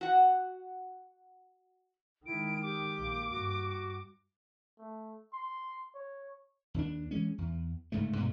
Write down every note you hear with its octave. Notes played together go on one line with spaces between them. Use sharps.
F#4 F#5
D#3 G#3 E4 D7
G4 D6
A#1 A#3
G2 F#4
A3
C6
C#5
D#2 C#4 D4
E3 G#3 C#4
E2
G1 G#2 C#3 A3
D2 G2 B2 A3